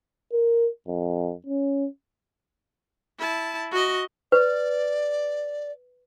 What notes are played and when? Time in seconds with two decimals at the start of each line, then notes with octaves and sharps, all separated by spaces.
0.32 A#4
0.87 F2
1.47 C#4
3.19 E4 A5
3.71 F#4 D#5
4.32 B4 D5